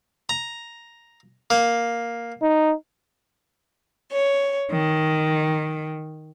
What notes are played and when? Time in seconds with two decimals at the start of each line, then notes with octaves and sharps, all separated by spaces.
0.29 A#5
1.50 A#3
2.42 D#4
4.10 C#5
4.71 D#3